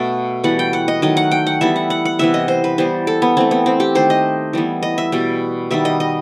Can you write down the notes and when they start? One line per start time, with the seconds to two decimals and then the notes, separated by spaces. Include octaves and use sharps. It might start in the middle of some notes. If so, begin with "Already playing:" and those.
Already playing: B2 A3 E5 F#5
0.44 E3 G3 B3 F#5
0.59 G5
0.73 F#5
0.88 D#5
1.02 D#3 F#3 A3 D#5
1.17 F#5
1.31 G5
1.47 F#5
1.61 E3 G3 B3 E5
1.76 F#5
1.90 F#5
2.05 F#5
2.19 C3 E3 B3 E5
2.34 D#5
2.48 C5
2.64 B4
2.78 E3 G3 B3 C5
3.07 A4
3.22 B3
3.37 E3 A3 C4
3.51 B3
3.66 C4
3.80 G4
3.95 D#3 A3 C5
4.10 D#5
4.53 E3 G3 B3
4.83 D#5
4.98 E5
5.12 B2 G3 B3
5.71 D#3 G3 B3 E5
5.85 D#5
6.00 D#5